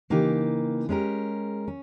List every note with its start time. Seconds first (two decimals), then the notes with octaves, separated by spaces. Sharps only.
0.10 C#3 E3 A#3 D#4 G4
0.89 G#3 C#4 G4 A#4
1.68 C#4